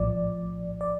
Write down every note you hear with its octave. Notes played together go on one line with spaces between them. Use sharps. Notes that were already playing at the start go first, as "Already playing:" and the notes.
Already playing: A#1 A2 F3 D5
D5